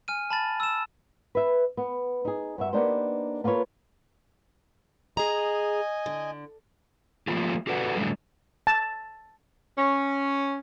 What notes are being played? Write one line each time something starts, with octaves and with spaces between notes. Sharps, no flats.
G#5 F6 D#7
A5 B5 A6
E6 E7
B4 E5
B3
D#4 G#4
G2 F#4 E5
A#3 B3 D4 D#4 G4 C5
A#3 F4 A4 B4 C#5
G#4 D#5 G#5 A#5
D3
F3 F#3 A3 A#3 F4 G4
F#4 G4 A4 B4 D5 F#5
A2 D3 F#3 G3 A3
A5
C#4